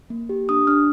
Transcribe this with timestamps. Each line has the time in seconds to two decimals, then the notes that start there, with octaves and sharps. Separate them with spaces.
0.10 A#3
0.29 G4
0.49 D4 D#6
0.67 D4 F6